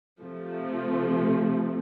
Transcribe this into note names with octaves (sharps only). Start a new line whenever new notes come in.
C3 F3 A3